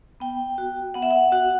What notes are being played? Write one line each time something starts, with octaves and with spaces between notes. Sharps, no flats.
B3 G5
F#4
B3 F#5
E5
F#5
F#4 F#5